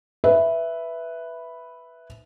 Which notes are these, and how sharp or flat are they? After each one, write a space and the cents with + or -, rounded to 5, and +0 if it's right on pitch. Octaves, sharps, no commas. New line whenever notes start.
B4 +0 E5 +0